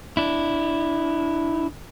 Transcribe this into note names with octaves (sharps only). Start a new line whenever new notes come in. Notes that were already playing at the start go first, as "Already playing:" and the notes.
D4 E4